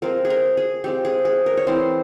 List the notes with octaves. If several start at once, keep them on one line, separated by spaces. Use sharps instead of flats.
F3 G#3 C4 A#4
G#4
A#4
G#4
F3 G#3 C4 G4
G#4
G#4
A#4
C#5
E3 G#3 C4 C5